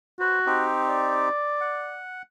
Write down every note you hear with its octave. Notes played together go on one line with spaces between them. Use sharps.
F#4 B4 C5
C4 D#4 G4
D5
F#5